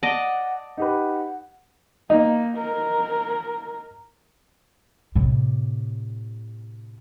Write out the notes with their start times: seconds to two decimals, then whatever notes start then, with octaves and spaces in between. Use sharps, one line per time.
0.03 D5 D#5 F#5 A5
0.77 D#4 G4 B4 F#5
2.10 A#3 D#4
2.58 A#4
5.15 A2 C3